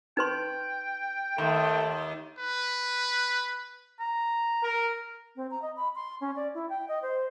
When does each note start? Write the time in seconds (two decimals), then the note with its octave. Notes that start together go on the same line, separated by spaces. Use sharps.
0.17 D#4 B4 G5 C6
1.38 D#2 A3
2.38 B4
4.00 A#5
4.63 A#4
5.36 C4
5.51 A#5
5.62 D#5
5.76 B5
5.95 C6
6.21 C#4
6.36 D5
6.54 E4
6.69 G5
6.88 D#5
7.02 C5